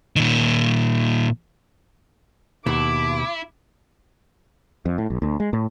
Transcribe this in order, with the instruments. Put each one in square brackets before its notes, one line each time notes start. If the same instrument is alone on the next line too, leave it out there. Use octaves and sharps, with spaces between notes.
[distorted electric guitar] A#2 D#3
[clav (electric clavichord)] D#2 [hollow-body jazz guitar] B2 [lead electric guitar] E4 [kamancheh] D6
[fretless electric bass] F2
A2
B1
D2
G#3
A2